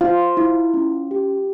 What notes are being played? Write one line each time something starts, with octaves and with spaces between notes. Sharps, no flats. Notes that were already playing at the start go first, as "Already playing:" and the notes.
F4 C5
E4
C#4
G4